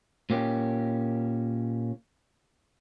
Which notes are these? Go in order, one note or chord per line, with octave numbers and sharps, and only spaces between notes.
A#2 A#3 C#4 G4